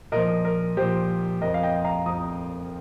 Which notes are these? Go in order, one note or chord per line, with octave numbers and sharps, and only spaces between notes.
A#2 F3 A#4 D#5
A#4
A#2 F3 G4 C5
F2 F3 A#4 D#5
F5
D#5 G5
F5 A#5
F2 F3 A#5 D#6